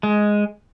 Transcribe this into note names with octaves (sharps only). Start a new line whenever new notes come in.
G#3